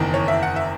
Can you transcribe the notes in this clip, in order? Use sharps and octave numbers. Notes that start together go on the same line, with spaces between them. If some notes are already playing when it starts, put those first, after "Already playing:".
Already playing: F#1 E2 D#3
C#5
E5
F#5
E5